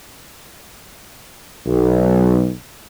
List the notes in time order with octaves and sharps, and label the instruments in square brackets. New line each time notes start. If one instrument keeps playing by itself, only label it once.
[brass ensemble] B1